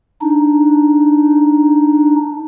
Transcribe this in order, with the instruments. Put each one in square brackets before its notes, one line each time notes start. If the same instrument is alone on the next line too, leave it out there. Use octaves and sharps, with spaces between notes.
[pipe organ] D4 D#4